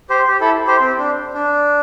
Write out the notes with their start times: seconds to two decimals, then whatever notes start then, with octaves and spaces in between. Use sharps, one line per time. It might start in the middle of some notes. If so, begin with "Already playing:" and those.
0.10 G4 C5
0.28 G4
0.40 E4 A4
0.67 G4 C5
0.80 C4
0.98 D4
1.34 D4